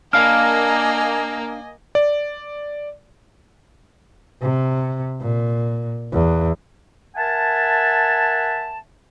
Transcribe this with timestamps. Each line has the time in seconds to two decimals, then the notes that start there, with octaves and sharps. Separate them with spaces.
0.13 A#3 D4 D#5 F5 G#5 F6
1.95 D5
4.42 C3
5.21 A#2
6.13 E2
7.16 A#4 E5 F#5 G#5 A5